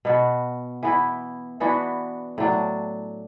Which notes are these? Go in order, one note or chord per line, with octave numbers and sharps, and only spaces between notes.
B2 B3 F#4
E3 B3 E4
E3 B3 D4 F#4
A2 F#3 D4